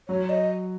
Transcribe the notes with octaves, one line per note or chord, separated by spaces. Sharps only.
F#3 C#5
D#5